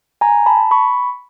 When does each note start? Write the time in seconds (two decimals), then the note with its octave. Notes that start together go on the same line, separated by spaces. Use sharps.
0.21 G#5 A#5
0.46 A5 B5
0.71 B5 C#6